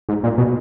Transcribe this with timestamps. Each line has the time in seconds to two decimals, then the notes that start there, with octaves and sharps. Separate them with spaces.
0.09 G#2
0.24 A#2
0.38 B2